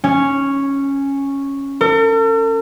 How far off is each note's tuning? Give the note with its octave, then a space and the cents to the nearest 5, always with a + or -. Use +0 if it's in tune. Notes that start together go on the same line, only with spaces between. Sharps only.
C#4 -5
A4 +45